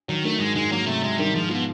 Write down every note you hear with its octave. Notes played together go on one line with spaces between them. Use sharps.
D#3 F#3
D#3 A3
G#2 G#3
G#2 G#3
F#3 A#3
C3 A3
C3 G#3
D#3 G3
G#2 F3
B2 F3